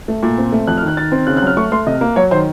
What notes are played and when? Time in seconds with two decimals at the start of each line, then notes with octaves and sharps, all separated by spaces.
0.08 A3
0.23 A#2
0.38 C4
0.52 A3
0.67 F2 F#6
0.77 F6
0.83 D#3
0.88 F#6
0.97 D#3 A6
1.12 C4
1.27 C#3 F#6
1.37 F#6
1.42 F#3 F6
1.57 A3 C#6
1.72 A3 C6
1.86 C3 D#5
2.01 A#3
2.16 F#3 C#5
2.31 D#3 C5